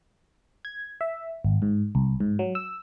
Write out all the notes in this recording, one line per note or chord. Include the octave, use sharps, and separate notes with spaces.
G#6
E5
G#1
G#2
C2
G#2
F#3
E6